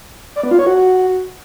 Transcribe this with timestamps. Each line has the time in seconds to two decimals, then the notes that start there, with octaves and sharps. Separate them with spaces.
0.36 D5
0.43 B3
0.51 F4
0.59 C#5
0.67 F#4